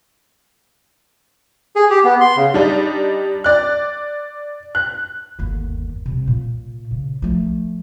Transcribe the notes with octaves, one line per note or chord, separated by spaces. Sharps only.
G#4
G4
B3
C6
C#3
G3 D4 D#4
D5 F#6
F#6
G1 D#2
C3 G3
A#2
C#3
F3 A3